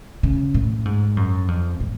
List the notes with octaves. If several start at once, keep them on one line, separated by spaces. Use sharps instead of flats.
C#3
A2
G#2
F#2
F2
A2